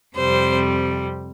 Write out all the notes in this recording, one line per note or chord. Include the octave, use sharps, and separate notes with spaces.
F2 C3 G3 C5